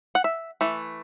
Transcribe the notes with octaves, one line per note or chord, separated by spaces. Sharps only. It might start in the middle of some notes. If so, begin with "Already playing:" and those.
F#5
E5
E3 A3